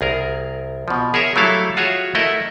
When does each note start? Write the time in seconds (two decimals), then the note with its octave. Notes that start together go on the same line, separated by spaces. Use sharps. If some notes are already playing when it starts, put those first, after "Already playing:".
0.01 C2 G#4 A#4
0.88 B2 F3
1.14 G#4 A#4 C#5 E5
1.36 F#3 G3 A3 E4 A4 F5
1.77 F4 F#4 G#4 C#5 E5
2.15 A3 E4 A#4 D#5 E5 F#5